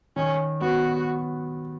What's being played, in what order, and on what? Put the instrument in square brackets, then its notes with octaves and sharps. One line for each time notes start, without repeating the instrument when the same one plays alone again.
[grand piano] D#3 [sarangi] C#4
[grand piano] B3 [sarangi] F#4